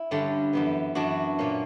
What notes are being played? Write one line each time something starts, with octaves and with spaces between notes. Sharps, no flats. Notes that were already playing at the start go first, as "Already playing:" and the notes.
Already playing: E4
G2 D3 G3 C#4
F#2 E3 B3
F#2 E3 B3 D4 F#4
A#2 A#3 C#4